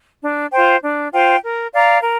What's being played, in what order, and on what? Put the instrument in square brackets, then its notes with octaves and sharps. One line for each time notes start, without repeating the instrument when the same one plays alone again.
[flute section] D4
F4 C5 G5
D4
F4 C5 G5
A#4
D5 F5 A#5
A#4